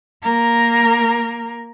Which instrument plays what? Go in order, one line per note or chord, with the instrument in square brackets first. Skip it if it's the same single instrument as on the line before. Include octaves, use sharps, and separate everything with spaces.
[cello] A#3 A#4